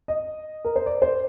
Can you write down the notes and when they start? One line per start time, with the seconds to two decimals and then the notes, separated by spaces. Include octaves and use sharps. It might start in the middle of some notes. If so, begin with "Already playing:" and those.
0.08 D#5
0.65 A#4
0.76 C5
0.86 D5
1.02 C5